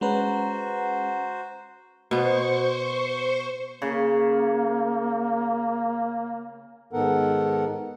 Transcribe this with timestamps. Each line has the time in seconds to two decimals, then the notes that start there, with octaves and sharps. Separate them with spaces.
0.01 G#3 C#4 F#4 B4 C5 F#5 A#5
2.11 B2 B3 C5 C#6
3.82 C#3 A#3
6.93 G#2 D#3 B3 A4 A#4 F#5